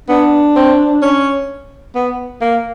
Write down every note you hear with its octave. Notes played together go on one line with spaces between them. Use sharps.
B3 D4
C4
C#4
B3
A#3